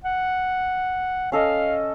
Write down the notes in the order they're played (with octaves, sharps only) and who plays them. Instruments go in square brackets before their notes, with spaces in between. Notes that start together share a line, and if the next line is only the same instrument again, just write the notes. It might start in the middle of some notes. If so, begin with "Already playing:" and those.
[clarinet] F#5
[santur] C#4 A4 D#5 [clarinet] F5